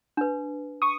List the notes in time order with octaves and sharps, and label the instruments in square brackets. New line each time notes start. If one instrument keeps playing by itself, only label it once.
[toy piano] D4 B4
[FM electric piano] C#6 D#6